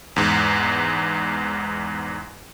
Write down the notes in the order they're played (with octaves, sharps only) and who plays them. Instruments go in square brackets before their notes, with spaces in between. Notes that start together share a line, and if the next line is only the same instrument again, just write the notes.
[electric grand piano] E2 G#2